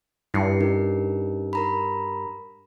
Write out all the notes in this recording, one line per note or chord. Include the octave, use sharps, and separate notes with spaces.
G2 E4 C7 C#7
C#4 D#4 A#4
A#4 A#5 B5